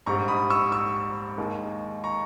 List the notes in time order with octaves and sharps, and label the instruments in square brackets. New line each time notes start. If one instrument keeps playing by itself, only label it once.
[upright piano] A#1 G#2 G3 [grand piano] A#5 C#6
[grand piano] B5 D#6
C#6 E6
C#6 E6
[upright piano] D#2 D#3 G#3 D#4
[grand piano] A#5 C#6